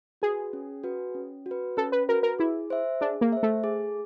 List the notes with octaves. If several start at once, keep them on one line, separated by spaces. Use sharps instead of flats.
F#4 G#4 B4
C#4
F#4 B4
C#4
F#4
B4
C#4 A4
B4
F#4 A#4 B4
A#4
E4 G#4
C5 E5
D4 G#4
A#3
C5 E5
A3
G#4